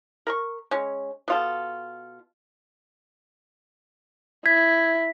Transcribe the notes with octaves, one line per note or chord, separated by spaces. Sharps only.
A#4 B5 C#6
G#3 C#4
B2 F4 A4
E4 G#6 B6